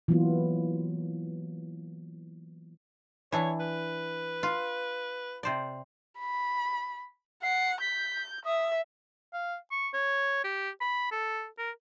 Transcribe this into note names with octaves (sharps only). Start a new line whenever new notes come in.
E3 F#3 A#3 B3 F4
E3 D4 E4 C#5
B4
F4
C3 C5 D5
B5
F#5 C7
G6 B6
E5 D#6
F5
C#6
C#5
G4
B5
A4
A#4